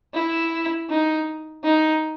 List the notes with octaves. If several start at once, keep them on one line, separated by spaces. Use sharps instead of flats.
E4
D#4
D#4